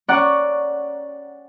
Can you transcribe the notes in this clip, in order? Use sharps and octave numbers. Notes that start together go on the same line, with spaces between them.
C#4 D5 F#5 A#5 C#6 F#6